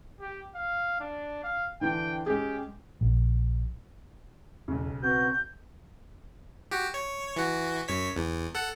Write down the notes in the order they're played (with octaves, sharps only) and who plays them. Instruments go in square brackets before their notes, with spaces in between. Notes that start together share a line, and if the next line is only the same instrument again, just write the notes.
[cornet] G4
F5
D4
F5
[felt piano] D3 E3 D4 [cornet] G5
[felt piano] G#3 C#4 G#4 [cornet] G4
[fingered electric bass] A#1
[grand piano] B1 C#3 [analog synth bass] E2
[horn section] B3 F#4 [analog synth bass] C4 [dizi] G6
[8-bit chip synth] F#4 G4
C#5
E3 F#4
F#2 C#5 B6
E2
A4 F#5